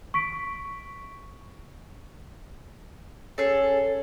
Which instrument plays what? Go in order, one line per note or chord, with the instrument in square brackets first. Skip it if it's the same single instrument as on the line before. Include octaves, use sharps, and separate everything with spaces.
[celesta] C#6 B6 D7
[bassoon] C#4 [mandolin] G#4 A4